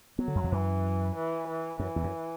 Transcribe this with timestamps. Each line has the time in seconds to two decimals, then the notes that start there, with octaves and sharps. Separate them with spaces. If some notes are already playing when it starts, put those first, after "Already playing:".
0.19 F#3 B3
0.28 D3
0.35 F#2
0.44 E2
0.52 F#2 E3
1.15 E3
1.48 E3
1.79 F#2 E3
1.96 E2
2.04 F#2